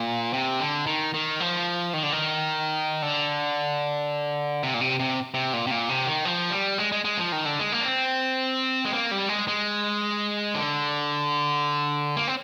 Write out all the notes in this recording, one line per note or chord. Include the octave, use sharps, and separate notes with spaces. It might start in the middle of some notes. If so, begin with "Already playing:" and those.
Already playing: A#2
C3
D3
D#3
D#3
F3
D#3
D3
D#3
D3
C3
A#2
C3
C3
C3
A#2
C3
A#2
C3
D#3
F3
G3
G#3
G#3
G#3
F3
D#3
D3
G#3
A#3
D4
C4
G#3
A#3
G3
G#3
G#3
D3
A#3
C4